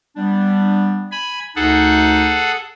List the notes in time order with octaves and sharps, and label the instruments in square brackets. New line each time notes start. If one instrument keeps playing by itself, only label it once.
[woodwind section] G3 B3 D4
[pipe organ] G#5 B5
[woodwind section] D2 D#4 [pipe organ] G#4 A4 F#5